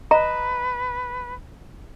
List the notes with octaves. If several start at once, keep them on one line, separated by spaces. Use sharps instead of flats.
B4 D#5 A#5